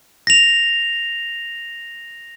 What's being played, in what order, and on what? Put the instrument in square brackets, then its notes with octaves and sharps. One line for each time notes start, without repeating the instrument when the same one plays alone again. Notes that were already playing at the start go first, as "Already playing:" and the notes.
[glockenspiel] A#6 F7